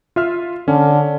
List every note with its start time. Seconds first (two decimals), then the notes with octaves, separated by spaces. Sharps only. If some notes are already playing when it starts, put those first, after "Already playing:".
0.16 F4 E5 F6
0.68 D3 C#4